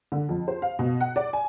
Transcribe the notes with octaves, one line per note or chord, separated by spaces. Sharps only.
D3
F2
C5
F5
B2
F#5
D5
G#5